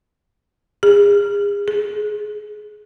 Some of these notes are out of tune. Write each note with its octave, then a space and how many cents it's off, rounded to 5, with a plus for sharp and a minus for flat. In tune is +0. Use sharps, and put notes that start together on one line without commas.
G#4 -35
G#4 +20